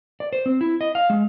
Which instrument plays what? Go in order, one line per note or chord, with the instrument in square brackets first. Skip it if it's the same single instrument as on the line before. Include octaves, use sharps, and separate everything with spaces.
[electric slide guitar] D5
C5
C4
E4
D#5
F5
G#3